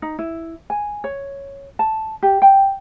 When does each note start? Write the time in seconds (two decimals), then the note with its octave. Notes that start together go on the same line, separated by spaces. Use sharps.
0.02 D#4
0.19 E4
0.70 G#5
1.04 C#5
1.79 A5
2.23 G4
2.42 G5